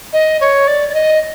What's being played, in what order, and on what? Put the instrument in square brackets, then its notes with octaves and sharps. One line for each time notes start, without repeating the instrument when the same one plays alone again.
[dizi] D#5
C#5
D5
D5
D#5